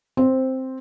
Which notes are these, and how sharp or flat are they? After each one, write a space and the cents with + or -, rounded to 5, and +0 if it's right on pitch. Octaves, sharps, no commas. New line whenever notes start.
C4 +0 C5 +5